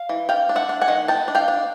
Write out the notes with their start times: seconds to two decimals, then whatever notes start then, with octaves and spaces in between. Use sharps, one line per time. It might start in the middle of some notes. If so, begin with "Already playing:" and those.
Already playing: F5
0.09 E3
0.29 D4 F5 G5
0.49 D4
0.56 E5 F#5
0.69 D4
0.81 F#5 G#5
0.88 D#3
1.08 B3 G5 A5
1.28 D4
1.35 F5 G5
1.48 D4